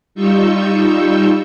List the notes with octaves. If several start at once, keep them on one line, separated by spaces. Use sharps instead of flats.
G3 D#4 F4 C#6 E6 G6